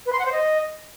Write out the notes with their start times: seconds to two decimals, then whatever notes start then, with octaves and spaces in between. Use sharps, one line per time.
0.05 B4
0.12 C6
0.19 F#5
0.25 C5
0.32 D#5